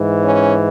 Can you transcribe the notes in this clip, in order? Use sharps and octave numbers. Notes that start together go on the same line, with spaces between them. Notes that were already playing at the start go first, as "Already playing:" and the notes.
Already playing: G#2 E3
C#4